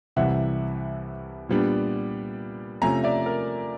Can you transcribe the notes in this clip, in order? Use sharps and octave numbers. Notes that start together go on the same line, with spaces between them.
C2 C3 E3 G3 E5 F#5
A#2 G3 B3 D4
C3 F3 A3 C#4 G#5 A#5
D5 E5
A#4